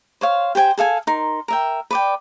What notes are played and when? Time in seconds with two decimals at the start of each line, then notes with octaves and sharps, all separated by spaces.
0.21 C5 C#5 F5
0.55 G4 C5 G5 G#5
0.78 G#4 A4 F5 G#5
1.07 D#4 A#4 C6
1.48 A#4 E5 G5
1.91 B4 D5 G5